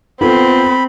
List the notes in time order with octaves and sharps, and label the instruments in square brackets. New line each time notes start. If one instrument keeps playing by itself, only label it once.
[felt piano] B3 F4 A4 [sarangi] C4 [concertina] B5